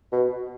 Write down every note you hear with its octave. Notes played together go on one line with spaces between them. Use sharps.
B2